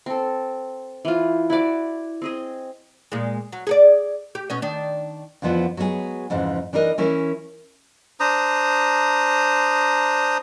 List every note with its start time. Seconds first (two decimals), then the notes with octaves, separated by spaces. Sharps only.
0.06 C4 A4
1.05 E3 F4
1.50 E4 F#4 D5
2.22 C4 G#4 D#5
3.12 A#2 G#3
3.53 F#3
3.67 G#4 A4 D5
4.35 G4
4.50 B2 C#4 D#5
4.62 D#3 D4
5.42 F2 D3 E3 F3 B3
5.77 F#3 G#3 B3 E4 G#4
6.30 F2 G#2 C#3 E3
6.73 E3 D4 D#4 A#4 D#5
6.98 E3 C#4 E4 A#4
8.20 D4 C5 A#5 D#6